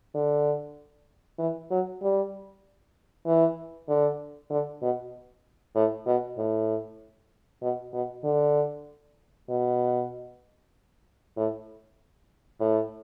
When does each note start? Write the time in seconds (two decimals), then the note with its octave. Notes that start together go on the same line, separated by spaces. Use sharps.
0.15 D3
1.39 E3
1.71 F#3
2.02 G3
3.26 E3
3.88 D3
4.50 D3
4.82 B2
5.75 A2
6.06 B2
6.38 A2
7.62 B2
7.94 B2
8.24 D3
9.50 B2
11.37 A2
12.60 A2